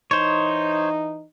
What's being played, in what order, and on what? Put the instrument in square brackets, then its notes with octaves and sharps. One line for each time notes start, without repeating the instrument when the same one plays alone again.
[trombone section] E3 D#4 [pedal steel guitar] C5 C#5